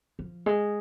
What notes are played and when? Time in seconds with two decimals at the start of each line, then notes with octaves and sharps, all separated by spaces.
0.19 F3
0.46 G#3